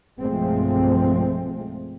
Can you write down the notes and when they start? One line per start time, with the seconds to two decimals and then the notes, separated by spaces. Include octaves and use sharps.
0.21 B1 G2 F3 G#3 A3 C4